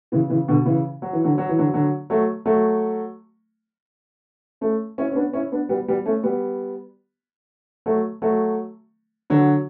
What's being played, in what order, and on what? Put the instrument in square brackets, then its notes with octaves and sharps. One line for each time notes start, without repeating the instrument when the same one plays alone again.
[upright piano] C#3 E3
C#3 E3
B2 D3
C#3 E3
F#3
E3
D3 F#3
F#3
E3
D3 F#3
D3 F#3
F#3 A3
F#3 A3
A3 C#4
C#4 E4
C#4
B3 D4
C#4 E4
B3 D4
G3 B3
G3 B3
A3 C#4
G3 B3
F#3 A3
F#3 A3
D3 F#3